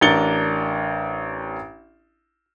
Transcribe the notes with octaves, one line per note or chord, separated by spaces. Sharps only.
A1 D4 A#4 A6 C#7 G7